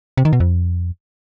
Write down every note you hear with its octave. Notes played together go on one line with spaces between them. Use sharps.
C3
D#3
B2
F2